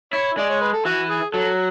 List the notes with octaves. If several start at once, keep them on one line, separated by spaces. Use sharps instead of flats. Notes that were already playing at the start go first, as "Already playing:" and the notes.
E4 C#5
G#3 D5
C#5
B4
A4
E3 F#4
G#4
F#3 A4